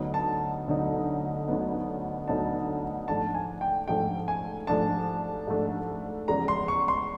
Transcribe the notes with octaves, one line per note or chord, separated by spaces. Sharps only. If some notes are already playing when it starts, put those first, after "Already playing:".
Already playing: D2 D3 F#3 B3 D#4
A5
D2 D3 F#3 B3 D#4
D2 D3 F#3 B3 D#4
D2 D3 F#3 B3 D#4 A5
G#2 F3 A3 D4 A5
G#5
G5
G#2 F3 A3 D4 G5
G#5
G#2 F3 A3 D4 A5
G#2 F3 A3 D4
E2 C#3 F3 G#3 A#5
C6
C#6
C6